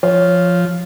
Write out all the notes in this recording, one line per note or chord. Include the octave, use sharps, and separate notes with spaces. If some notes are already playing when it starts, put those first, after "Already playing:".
F3 C#5